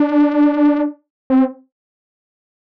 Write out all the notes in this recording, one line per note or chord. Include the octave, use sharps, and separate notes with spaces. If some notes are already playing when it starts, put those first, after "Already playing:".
Already playing: D4
C4